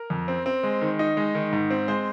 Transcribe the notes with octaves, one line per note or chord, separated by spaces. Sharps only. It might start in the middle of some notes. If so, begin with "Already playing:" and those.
Already playing: A#4
F2
C4
C4
G#3
D#3
D#4
G#3
D#3
G#2
C4
G#3 C5